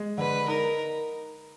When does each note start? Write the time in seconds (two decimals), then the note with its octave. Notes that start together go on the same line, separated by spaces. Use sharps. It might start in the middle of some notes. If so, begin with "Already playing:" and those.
Already playing: G#3
0.18 D3 B4
0.48 D#4 A#4